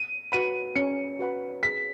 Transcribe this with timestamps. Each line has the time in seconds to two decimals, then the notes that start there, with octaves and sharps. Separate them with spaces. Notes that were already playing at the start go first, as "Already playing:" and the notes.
Already playing: D#7
0.32 F#4 B4 F#5 B5 D#7
0.75 C#4 C#7
1.19 F#4 B4 F#5 B5
1.63 G#4 B6